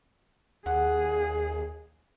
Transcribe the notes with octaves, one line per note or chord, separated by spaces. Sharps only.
D#2 G#4 F#5